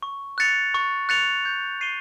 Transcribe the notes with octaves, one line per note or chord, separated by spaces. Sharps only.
C#6
F#6 A6 C#7 F7
C#6
F#6 A6 C#7 F7
G6
C7 D#7 G7